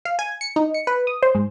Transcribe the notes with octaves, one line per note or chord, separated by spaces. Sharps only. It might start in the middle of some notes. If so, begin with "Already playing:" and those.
F5
G#5
C#7
D#4
C#7
B4
D#6
C5
G#2